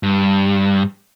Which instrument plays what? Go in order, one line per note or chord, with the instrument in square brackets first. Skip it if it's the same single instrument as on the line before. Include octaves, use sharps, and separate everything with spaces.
[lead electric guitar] G2